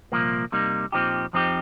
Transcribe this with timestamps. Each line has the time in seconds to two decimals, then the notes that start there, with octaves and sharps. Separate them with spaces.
0.12 C2 A#2 F3 A#3
0.52 C3 G3 A#3 D#4
0.92 A#2 F3 C4 D#4 G4
1.33 F2 F3 C4 D#4 G4